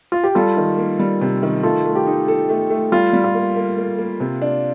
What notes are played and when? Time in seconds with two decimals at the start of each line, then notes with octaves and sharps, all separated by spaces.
0.12 F4
0.24 G4
0.35 G3 F4 A4
0.57 D#3
0.78 A#3
0.99 G3
1.21 C3
1.43 D#3
1.63 A3 F4 A4
1.85 A3
1.95 G4
2.07 D#4
2.28 A4
2.49 A3
2.70 A3
2.92 G3 F4
3.13 G3
3.24 F4
3.35 A#3
3.56 A#3
3.78 A#3
3.99 A#3
4.20 C3
4.42 D4